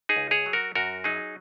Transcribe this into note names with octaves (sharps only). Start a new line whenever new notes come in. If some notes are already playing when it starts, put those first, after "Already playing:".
D#4 G#4
C#2
G#4 C#5
F#3
F#4 A#4
F#2 F#4 A#4
F#3 D#4 G#4